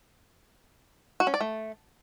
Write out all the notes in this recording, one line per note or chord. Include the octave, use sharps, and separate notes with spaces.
F#4
C#4
D5
A3